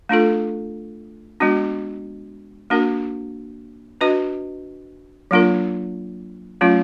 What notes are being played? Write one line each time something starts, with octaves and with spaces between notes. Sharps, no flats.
A3 D4 F4 A4
G#3 B3 D4 F#4
A#3 D4 F#4 A#4
D4 F#4 B4 D#5
F#3 A#3 D4 F4 A#4
F#3 A3 C#4 F4